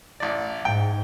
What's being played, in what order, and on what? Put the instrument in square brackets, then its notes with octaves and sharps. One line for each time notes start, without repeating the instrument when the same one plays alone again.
[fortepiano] A1 D5
[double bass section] G#2 [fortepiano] G5